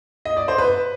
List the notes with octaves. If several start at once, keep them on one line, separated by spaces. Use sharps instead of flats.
D#5
D5
C5
B4